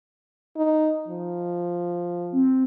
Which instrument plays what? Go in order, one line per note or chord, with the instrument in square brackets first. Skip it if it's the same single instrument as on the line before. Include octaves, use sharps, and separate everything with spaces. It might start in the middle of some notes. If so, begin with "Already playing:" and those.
[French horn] D#4
F3
[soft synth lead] C4